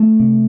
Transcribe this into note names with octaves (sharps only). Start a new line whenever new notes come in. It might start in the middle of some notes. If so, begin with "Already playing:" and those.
Already playing: A3
C3